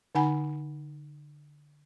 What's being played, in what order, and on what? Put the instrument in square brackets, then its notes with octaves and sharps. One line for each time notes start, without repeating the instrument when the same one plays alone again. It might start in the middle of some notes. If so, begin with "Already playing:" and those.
[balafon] D3 D#4 F#5 G#5 B5